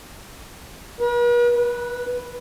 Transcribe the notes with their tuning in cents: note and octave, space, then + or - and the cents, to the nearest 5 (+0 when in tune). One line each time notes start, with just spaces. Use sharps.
B4 -45
B4 -5